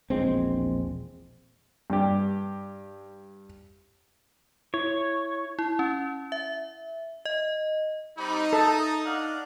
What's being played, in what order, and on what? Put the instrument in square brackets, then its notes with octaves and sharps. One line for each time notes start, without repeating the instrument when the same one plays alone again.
[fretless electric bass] E1 A#1 G#3 C4
[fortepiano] G2 G4
[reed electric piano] E4 [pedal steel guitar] C#5
[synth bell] E4
C#4
E5
D#5
[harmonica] G3 C4 B5 [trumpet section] D#4
[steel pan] A4 [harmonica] D#5
[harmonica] D4 F5 F#5